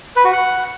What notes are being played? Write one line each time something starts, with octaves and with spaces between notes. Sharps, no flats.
B4
F#4
F#5